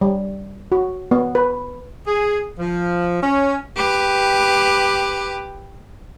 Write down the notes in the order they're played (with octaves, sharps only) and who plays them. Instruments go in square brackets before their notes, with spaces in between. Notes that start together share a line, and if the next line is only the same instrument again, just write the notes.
[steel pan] G3
F#4
B3
B4
[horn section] G#4
F3
C#4
[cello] G4 B4